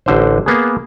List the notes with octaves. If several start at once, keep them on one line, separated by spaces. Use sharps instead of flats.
A1 D3 C5
A#3 B3 G#4